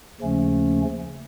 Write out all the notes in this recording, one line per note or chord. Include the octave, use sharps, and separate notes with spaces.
D#2 C#3 F3 A3 C#4